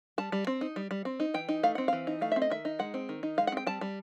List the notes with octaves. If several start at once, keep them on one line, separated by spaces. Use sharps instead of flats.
G3 A5
G3
C4
D#4
G3
G3
C4
D#4
E3 G5
D#4
A3 F5
C4 F#5
E3 F5
D#4
A3 F5
C4 E5
D#5
D#3 E5
D#4
G#3 F#5
C4
D#3
D#4
G#3 F5
F#5
C4 G5
G3 A5
G3